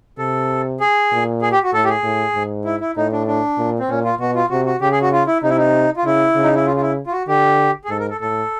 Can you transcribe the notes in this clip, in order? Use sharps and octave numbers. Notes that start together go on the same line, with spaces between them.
C3 A4
G#4
A#2
G#4
G4
F#4
A2 A4
G4
G#4
A2
G#2
E4
E4
A2 D#4
D4
D4
A#2
C4
A#2 C#4
F4
B2 F#4
F4
C3 F#4
F#4
C#3 G4
G#4
F#4
F4
E4
C3 D#4
E4
D#4
F4
C#3 E4
C#3
D#4
E4
F4
F4
E4
F4
F#4
D3 G4
G#4
G#2 A4
A#4
A4
A2 A4